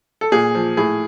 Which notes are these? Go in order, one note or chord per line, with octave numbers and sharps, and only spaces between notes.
A4
A#2 G#4
F3
A2 G#4